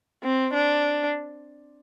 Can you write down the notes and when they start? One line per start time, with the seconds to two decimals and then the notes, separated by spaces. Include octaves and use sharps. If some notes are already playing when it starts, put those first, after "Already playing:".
0.23 C4
0.54 D4